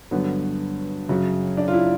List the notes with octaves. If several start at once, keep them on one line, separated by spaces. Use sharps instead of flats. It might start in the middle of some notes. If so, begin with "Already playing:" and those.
G2 D3 F#3 B3
F#2 C#3 F#3
D4
F4
E4